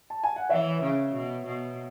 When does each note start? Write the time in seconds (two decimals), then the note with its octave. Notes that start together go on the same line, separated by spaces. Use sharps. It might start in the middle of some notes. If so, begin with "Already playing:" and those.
0.10 A5
0.24 G#5
0.36 F#5
0.49 E3 C#5 E5
0.82 C#3
1.13 B2
1.45 B2